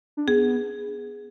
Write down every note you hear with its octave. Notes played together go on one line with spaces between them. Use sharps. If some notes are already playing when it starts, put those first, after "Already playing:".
D4
B3 G#4